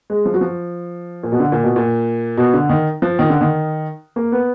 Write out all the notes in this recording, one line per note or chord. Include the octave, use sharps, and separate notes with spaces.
G#3
F3
F#3
F3
A#2
B2
D3
A#2
B2
A#2
B2
D3
D#3
F3
D#3
D3
D#3
A#3
B3